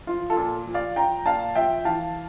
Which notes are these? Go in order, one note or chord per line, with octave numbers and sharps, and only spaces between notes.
F3 F4
F4 A4
A#2
F3
D5 F5
F3 G5 A#5
A#2 F5 A5
F3 E5 G5
E3 F5 A5